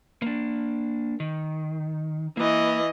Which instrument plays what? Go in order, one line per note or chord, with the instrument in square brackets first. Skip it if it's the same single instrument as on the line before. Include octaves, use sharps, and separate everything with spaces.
[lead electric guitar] A#3 D4
D#3
[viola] E3 D#5 [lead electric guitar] A#3 B4